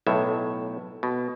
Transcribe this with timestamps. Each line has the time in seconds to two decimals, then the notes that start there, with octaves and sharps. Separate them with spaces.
0.06 B1 A2 E5
1.03 B2